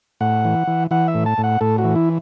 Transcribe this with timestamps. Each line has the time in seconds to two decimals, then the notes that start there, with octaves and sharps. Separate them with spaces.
0.21 A2 F#5
0.45 E3
0.67 E3
0.91 E3 F#5
1.08 E5
1.14 A2
1.26 A5
1.38 A2
1.44 F#5
1.61 A2 A4
1.78 F#4
1.84 E3
1.96 E4